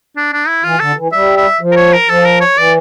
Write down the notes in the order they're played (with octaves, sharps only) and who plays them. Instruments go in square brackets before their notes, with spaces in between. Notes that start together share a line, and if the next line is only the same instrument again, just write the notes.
[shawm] D4
D4
E4
[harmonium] E3 [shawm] F4
[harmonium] D3 [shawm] A4
[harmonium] E3
[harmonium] G3 [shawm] E5
[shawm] E5
[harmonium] F3
[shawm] A#4
C#5
A#4
[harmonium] F3 [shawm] A4
[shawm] A#4
C#5
[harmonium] E3 [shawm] D5